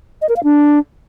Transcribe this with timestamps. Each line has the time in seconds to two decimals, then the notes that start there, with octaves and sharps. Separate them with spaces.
0.22 D#5
0.29 A#4
0.36 F5
0.44 D4